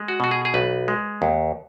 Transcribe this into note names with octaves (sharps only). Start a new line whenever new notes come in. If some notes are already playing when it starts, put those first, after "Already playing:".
Already playing: G#3
F#4
B2 F#4
G#4
G#4
B1 B4
G#3
D#2